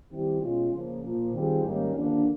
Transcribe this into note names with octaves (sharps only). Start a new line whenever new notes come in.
D#3 G3 C4 E4 G4
B2 G#3 C#4 F4
C#3 F3 A#3
A#2 F3 A#3
D#3 G3 C4 F4 G#4
G#2 D#3 G3 A#3 C#4
D#2 D3 F3 A#3 D4